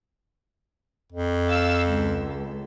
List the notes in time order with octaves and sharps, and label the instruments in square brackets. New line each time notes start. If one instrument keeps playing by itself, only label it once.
[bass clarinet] F2
[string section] F5 E6
C#2